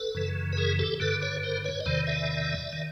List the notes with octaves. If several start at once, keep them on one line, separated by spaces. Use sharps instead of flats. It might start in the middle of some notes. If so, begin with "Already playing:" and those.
Already playing: A4 B4
F#2 C#3 E3
B4
G#4 A#4
G4 A4
G2 D3 A4 B4
B4 C#5
A#4 C5
B4 C#5
D#5
E2 C3 D#3 C5 D5
D5 E5
D#3